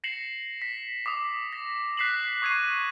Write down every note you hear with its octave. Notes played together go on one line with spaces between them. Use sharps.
A#6 C7 C#7 E7 F#7
B6
D6 D#6
A#6
F#6 B6 C7 E7 F#7
C#6 D#6 G#6 A#6 C7 D#7